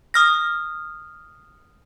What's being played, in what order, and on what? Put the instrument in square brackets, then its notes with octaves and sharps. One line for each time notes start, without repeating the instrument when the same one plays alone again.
[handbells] D#6 F6 A#6